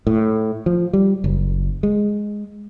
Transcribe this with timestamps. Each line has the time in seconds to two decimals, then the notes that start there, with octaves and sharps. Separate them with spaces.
0.07 A2
0.66 F3
0.93 G3
1.24 F#1
1.83 G#3